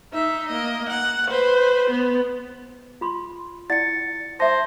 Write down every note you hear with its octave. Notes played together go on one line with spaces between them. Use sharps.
D#4 E5
A#3 D#5
F#5
B4 C5
B3
F4 B5 C6
E4 D5 F#5 A6 C#7
C5 E5 A5 A#6